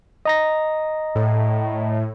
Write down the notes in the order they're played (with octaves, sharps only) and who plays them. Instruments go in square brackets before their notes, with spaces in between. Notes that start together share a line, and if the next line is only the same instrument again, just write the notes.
[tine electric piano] D#5 A#5 A#6
[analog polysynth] A2